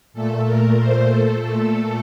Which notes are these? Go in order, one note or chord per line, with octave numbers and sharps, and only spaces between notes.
A#2 A3 A4
A#4
C5
A4
A#2 A3 A4